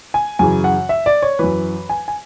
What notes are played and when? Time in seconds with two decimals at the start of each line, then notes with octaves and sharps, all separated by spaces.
0.14 G#5
0.39 F#2 C#3 E3 G#5
0.64 F#5
0.89 E5
1.06 D5
1.22 C#5
1.39 F#2 E3 B4
1.89 G#5
2.08 G#5